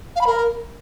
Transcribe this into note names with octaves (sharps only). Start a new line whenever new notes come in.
F5
B5
A#4